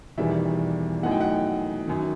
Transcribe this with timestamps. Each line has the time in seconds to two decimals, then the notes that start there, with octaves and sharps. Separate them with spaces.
0.18 E1 E2 D#3 G3 E5
1.03 F#2 E3 A3 D#4 F#5
1.11 G5
1.21 F#5
1.88 F#2 D#3